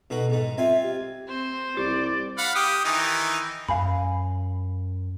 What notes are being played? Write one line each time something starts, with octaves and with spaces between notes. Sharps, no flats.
B2 D#4 F#4 A4
G#2 D#4
C4 F4 E5 G#5
G4
C4 C5
C2 G4 D5
F5 F#5 B5
G4 D#6
D#3 E3 D#4
F#2 F5 G#5 B5